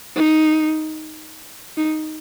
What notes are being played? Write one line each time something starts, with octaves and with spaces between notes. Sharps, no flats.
D#4
D#4